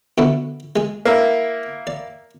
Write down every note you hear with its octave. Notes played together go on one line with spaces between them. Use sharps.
B2 D3 E4
G#3 G#4
A#3 E4
D5